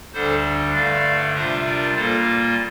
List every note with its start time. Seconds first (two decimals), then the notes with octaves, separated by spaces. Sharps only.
0.13 D2 D3 G3 D4 A4 C5
0.74 G2 D3 A3 D5 F5
1.34 C3 G3 D4 F4 C5 E5
1.65 A#4 D5
1.95 A#2 G3 A#3 F4 A4 C5